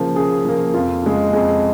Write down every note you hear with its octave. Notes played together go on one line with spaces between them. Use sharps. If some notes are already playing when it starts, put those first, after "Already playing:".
Already playing: C#3 F3 A#3
C#3 G#4
F3 A#3
F2 F4
C#3 G#3
F2 G#4